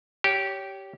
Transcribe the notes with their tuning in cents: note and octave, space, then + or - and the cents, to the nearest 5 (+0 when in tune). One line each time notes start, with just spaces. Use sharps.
G4 -10 C#5 +15